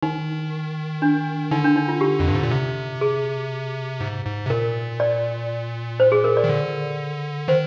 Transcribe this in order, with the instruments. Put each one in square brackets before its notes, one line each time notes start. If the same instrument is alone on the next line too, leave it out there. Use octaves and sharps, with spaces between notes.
[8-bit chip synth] D#3 [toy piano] D#4
[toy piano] D4
[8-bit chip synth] D3 [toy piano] D#4
[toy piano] D4
D#4
F4
G4
[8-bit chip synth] F2
G2
G#2
A#2
C3
[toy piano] G#4
[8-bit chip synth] G#2
G#2
C3
[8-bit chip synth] A#2 [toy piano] A#4
[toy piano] D5
C5
G#4
A#4
D5
[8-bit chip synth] D#3
D3
[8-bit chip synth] D#3 [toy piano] C5